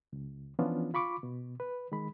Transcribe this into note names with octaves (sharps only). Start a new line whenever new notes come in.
C#2
E3 F3 B3 C#4 D4 F4
F4 B5 C#6 D6
B2
B4
D#3 G#3 B5